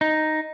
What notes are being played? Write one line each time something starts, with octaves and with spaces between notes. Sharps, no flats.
D#4